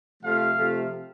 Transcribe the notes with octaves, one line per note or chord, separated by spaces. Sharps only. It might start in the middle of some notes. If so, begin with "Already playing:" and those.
C3 F3 A3 F5
C3 F3 A3